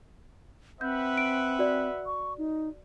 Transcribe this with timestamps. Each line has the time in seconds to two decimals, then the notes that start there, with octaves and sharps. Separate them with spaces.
0.81 C4 B4 E5 F#5 G6
1.17 D7
1.59 F#4 D5
2.06 C#6
2.38 D#4